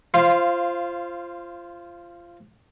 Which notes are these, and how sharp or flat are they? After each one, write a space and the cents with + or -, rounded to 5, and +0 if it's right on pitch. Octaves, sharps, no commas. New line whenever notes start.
F4 -20 C5 +10 F5 -5